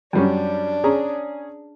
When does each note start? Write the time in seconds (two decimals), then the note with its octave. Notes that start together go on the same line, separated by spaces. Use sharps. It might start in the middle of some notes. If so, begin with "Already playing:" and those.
0.13 F#2 G3 C#4 D4
0.84 C#4 G#4 A#5